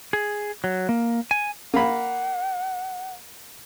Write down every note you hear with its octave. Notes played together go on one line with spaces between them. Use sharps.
G#4
F#3
A#3
G#5
A#3 F#5 B5